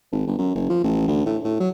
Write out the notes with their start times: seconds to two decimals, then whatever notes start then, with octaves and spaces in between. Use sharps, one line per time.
0.12 G#1
0.27 G1
0.39 F#2
0.55 F#1
0.70 F3
0.84 A1
1.08 D2
1.26 A2
1.44 A2
1.60 F#3